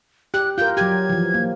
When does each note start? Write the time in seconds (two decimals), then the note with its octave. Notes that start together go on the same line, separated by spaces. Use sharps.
0.34 G4 F#6
0.58 F4 A#4 G6
0.77 F#3 G4 G#6
1.09 E3 F3
1.34 A#3